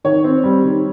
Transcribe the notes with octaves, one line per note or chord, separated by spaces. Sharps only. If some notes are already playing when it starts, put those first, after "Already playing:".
D#3 C#5
C4
G3
D#3